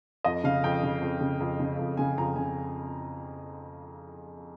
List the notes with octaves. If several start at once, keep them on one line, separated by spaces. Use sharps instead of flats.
F2 D#5
C#3 F5
F2 G5
C#3
F2
C#3
F2
C#3
F2
C#3 G#5
F2 A#5
C#3 G#5